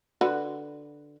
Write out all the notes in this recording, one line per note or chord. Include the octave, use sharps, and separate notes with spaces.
D3 F#4 B4